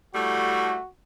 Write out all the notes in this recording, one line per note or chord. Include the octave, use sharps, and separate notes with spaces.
A2 G3 A3 F#4